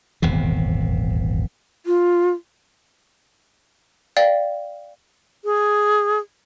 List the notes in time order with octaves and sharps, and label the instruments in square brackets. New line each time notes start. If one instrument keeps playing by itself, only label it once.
[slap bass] D#1 G#1 E2 C3
[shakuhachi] F4
[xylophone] D5 F5 G5
[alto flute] G#4